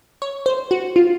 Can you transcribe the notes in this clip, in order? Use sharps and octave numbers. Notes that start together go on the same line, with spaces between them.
C#5
C5
F#4
F4